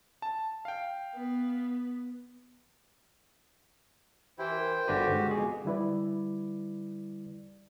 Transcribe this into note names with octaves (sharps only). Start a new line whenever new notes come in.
A5
F5 G5
B3
E3 E4 G4 C5 G5
A#4
G1 D4 F#4 G4 A4 B4
D3 G#3
F2 B2 G#4
D3 G3 E4 B4 D5